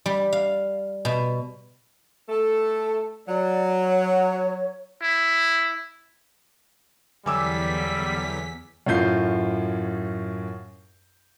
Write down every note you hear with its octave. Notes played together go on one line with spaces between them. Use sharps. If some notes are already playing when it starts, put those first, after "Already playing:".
G3
F5
B2
A3 A4
F#3 D5
C#5
E4
E2 D3 F#3 G3 G#5 D6 E6 B6
F#2 A2 F4 G6 C7